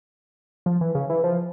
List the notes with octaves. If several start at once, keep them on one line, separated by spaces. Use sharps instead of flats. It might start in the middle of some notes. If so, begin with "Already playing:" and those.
F3
E3
C#3
E3
F3